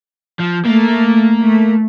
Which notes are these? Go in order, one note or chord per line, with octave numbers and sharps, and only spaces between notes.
F3
A3 A#3
A3